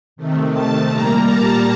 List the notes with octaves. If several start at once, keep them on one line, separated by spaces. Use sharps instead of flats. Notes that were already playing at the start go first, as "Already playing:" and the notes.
C3 D#3 A3
A5
A#2 G3 A#3 A#5
A5